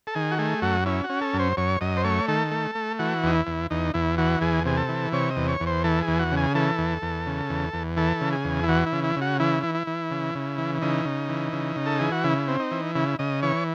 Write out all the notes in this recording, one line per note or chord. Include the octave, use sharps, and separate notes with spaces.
A4
D#3 G#4
F#4
A3 G#4
F#2 F#4
C#4 E4
F#4
C#4
A4
F#2
C5
F#2 C#5
F#2 D#5
C5
A3 C#5
D#3 A4
A3
A3
E3 F#4
E2 D#4
E4
E2
E2 D#4
E2 E4
E3 F#4
E2 G#4
C3 G#4
A4
E3
C3 C#5
D#5
E2
C#5
E2
C5
E3 A4
G#4
E2
F#4
C#3
G#4
E3 A4
E2
E2
C#3
E2
E2
E3 A4
C#3
G#4
E2
E4
E3 F#4
E4
C#3
E4
C#3
F#4
E3 E4
E3
E4
E3
C#3
C#3
E3
C#3 D#4
C#3
E3
C#3
C#3
A4
E3 G#4
F#4
C#3 E4
C4
D#4
E3
C#3 E4
C#3 D#5
E3 C#5